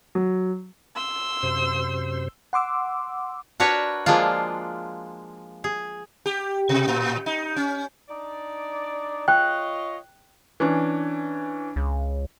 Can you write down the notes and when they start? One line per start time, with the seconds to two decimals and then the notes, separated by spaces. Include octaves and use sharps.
0.15 F#3
0.96 C6 E6
1.43 F#2 C3 C5
2.53 F#5 C6 D6 E6
3.60 D4 F#4 A#4 B4 C#5
4.06 F3 G#3 A#3 D4 F4
5.64 G#4
6.26 G4
6.69 B2
6.88 A2
7.26 D#4
7.56 C#4
8.09 D4 D#4 D5
9.28 F4 C#5 D#5 G5 F#6
10.60 E3 C#4 D4
11.76 C#2